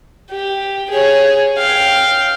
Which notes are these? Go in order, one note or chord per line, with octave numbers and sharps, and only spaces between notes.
G4
G#4 C#5
F5 G5